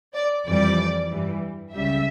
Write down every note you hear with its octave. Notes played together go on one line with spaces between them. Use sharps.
D5
F2 E3 G3 D5
G2 E3 G3
C#2 C#3 G3 E5